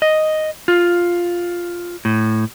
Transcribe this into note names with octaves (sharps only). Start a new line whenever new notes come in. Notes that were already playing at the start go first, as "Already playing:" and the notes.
D#5
F4
A2